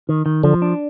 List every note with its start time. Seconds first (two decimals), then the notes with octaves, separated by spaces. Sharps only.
0.09 D#3
0.26 D#3
0.43 D3 F3
0.62 D4